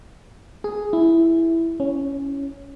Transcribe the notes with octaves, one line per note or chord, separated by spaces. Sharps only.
G#4
E4
C#4